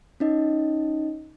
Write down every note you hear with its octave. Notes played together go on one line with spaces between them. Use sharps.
C#4 D#4 D#5